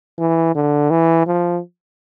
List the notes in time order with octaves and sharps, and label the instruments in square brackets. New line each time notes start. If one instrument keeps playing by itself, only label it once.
[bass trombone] E3
D3
E3
F3